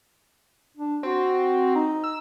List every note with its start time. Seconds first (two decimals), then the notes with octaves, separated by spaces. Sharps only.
0.77 D4
1.03 C4 F#4
1.75 D#4
2.04 E6